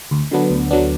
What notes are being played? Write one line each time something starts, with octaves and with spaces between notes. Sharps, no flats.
D2
D3 F#3 B3 D4
D2
D3 F#3 B3 D4